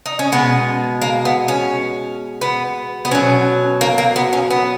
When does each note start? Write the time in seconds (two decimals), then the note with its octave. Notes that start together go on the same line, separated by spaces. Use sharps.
0.06 D#4
0.19 C#4
0.32 B2 G#3 B3
1.02 A#3
1.25 B3
1.48 C#4
2.41 B3
3.05 B3
3.11 B2 F#3 C#4
3.81 A#3
3.98 A#3
4.16 B3
4.33 C#4
4.50 B3